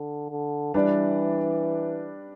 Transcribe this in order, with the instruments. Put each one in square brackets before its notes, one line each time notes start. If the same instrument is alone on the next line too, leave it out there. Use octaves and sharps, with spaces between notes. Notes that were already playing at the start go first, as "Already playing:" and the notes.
Already playing: [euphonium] D3
D3
[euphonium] E3 [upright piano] G3 D4 B4 D5